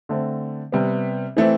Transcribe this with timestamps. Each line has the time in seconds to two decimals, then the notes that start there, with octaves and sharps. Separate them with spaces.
0.09 D3 A3 C4
0.72 C3 G3 B3
1.37 E3 A3 C4